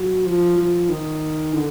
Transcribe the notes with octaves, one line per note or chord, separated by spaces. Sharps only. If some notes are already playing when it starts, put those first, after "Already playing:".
Already playing: F#3
F3
F3
D#3
D3